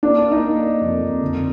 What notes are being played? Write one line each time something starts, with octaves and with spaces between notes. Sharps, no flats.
A#3 D4
A#3
D#4
A#3
A#3
F2
F2
D3